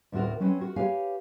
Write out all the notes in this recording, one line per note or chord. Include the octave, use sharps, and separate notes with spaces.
D2 A2 C4 F#4 A#4
F#3 C4 C#4 B4
F#4 A#4
G4 B4 C#5 F5 G#5